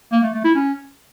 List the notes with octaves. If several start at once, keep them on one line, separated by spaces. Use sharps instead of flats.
A#3
A3
A3
E4
C#4